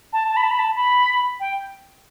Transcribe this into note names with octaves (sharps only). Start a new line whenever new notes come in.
A5
A5
B5
A5
B5
A5
B5
G5